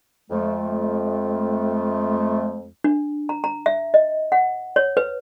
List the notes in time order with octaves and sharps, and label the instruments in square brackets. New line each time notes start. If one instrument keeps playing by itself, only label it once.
[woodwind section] F2 G#3 A3
[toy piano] D4
A#5
A#5
E5
D#5
F#5
C#5
B4